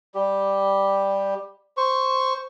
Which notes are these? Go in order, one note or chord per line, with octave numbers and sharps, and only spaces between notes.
G3 G4
C5 C#6